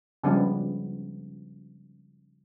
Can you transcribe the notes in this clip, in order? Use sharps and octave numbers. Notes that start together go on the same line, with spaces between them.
C#3 F3 G3 G#3 B3 D4